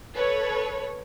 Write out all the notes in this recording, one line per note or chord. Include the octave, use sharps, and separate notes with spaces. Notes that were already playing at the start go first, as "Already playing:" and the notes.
A4 B4 C#5